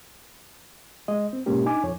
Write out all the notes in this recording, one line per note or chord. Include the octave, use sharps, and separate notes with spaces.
G#3 D#5
C4
G#2 B2 G#3 A#3 C#4 G4
D4 D#4 G#5 D6
F2 C#5